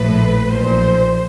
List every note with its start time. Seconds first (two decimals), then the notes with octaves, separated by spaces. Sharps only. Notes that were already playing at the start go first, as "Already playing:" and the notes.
Already playing: A#1 A2 F3 B4
0.50 B1 A#2 F3 C5